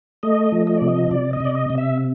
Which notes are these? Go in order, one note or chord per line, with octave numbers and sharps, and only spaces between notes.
A3 D#5
F3
D#5
C3 D5
D#5
C3 D5
D#5
C3 D5
D#5
C3
E5